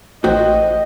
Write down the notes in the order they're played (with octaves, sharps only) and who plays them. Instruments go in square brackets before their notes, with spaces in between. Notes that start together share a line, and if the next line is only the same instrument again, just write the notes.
[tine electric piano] A1 A3 [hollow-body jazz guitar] F#4 C5 G5 [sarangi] D#5